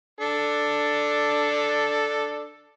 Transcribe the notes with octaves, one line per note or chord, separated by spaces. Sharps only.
D4 A4